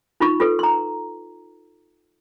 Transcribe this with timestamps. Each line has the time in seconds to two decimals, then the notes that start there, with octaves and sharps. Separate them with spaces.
0.20 D#4 F4 B5 C#6
0.40 F4 A4 B4
0.59 A#5 C6